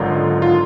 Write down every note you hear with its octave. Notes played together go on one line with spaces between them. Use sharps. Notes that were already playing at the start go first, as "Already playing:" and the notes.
Already playing: G#1 F#2 D3 F#3 D#4 F4
F4